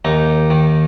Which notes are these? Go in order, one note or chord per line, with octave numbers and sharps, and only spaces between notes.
D#2 D#4
D#3